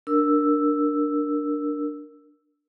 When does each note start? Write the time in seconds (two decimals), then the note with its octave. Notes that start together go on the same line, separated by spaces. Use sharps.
0.07 D4 A#4 E6